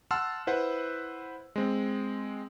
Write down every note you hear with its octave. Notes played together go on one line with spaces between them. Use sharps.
F#5 A5 C6 E6 F6
E4 B4 C5 F#5
G#3 C4